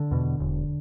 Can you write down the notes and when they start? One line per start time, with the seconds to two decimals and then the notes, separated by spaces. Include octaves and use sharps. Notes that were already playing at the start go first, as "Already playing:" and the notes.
Already playing: D3
0.11 E2 B2
0.40 E1